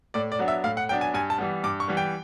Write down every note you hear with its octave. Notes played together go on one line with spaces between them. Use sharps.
A2 D5
D5
F#3 B3 D4
E5
A2 F5
F#5
F#3 B3 D4 G5
G#5
G2 G#5
A5
E3 G3 B3
G2 D6
C#6
E3 G3 B3
G5